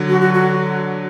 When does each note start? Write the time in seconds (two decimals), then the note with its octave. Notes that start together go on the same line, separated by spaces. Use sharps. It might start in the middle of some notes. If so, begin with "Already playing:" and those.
Already playing: D3 F#3
0.09 F#4
0.21 F#4
0.34 F#4